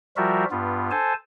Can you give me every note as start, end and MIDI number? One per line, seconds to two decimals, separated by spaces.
0.17 0.45 53
0.17 0.45 55
0.17 0.45 65
0.17 0.45 66
0.17 0.45 70
0.17 0.45 76
0.51 0.91 43
0.51 0.91 59
0.51 0.91 65
0.91 1.13 69
0.91 1.13 72
0.91 1.13 80
0.91 1.13 81